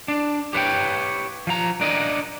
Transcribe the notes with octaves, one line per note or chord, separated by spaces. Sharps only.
D4
G4 B4 C#5 G5
F3 A#5
D4 A#4 D5 D#5